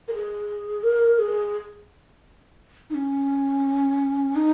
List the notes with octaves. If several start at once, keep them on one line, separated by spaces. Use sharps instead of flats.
A#4
G#4
A#4
G#4
D#4
C#4
D#4